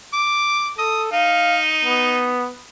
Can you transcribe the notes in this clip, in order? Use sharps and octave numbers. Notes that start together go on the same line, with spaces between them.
D6
A4 D#6
D#4 F5
B3